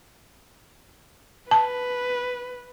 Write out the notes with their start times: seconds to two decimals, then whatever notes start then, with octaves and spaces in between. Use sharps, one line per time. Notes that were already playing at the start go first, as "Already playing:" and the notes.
1.51 B4 A5